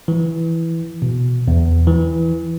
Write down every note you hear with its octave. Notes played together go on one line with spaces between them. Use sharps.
E3
B2
E2
E3